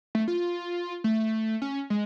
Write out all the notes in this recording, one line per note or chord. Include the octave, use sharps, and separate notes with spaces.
A3
F4
A3
C#4
G#3